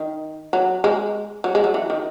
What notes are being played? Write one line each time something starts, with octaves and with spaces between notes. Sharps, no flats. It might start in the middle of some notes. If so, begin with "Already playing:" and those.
Already playing: D#3
F#3
G#3
F#3
G#3
F#3
E3
D#3